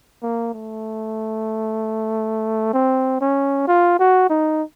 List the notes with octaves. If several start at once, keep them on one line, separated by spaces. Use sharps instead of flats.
A#3
A3
C4
C#4
F4
F#4
D#4